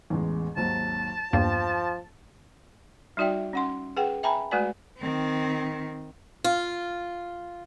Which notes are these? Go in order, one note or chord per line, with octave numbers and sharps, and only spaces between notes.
A1 E2 G#3
G#1 D#2 F#3 A5
E2 G2 F3 A#3 G5
G3 D#4 F#4 D5 E5 G5
C#4 F#5 C6
G#4 B4 F#5 G5
E5 G5 G#5 A#5 B5
G#3 A3 F#4 B4 D5 G#5
D#3 C4
F4